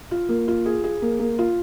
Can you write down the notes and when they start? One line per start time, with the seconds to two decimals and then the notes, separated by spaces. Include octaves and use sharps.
0.11 F4
0.29 A#3
0.48 F4
0.66 G#4
0.84 G#4
1.02 A#3
1.19 A#3
1.39 F4